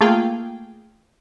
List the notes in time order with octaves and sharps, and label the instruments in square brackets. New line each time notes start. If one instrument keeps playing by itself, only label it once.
[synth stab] A3 A#3 F4 G#4 F5 G5